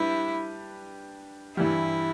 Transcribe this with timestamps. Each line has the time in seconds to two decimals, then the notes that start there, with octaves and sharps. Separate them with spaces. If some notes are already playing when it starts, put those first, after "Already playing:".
Already playing: G3 D4 E4 G4 B4
1.57 G2 E3 G3 E4